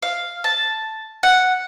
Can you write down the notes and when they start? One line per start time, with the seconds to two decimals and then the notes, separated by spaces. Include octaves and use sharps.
0.02 F5
0.44 A5
1.23 F#5